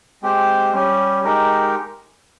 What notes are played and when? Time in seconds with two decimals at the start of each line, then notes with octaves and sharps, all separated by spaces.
0.22 G#3 C4 G4 C5
0.73 G3 C#4 G4
1.24 G#3 D#4 G4 A#4